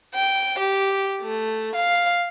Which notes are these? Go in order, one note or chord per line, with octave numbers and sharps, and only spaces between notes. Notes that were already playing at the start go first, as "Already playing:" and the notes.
G5
G4
A3
F5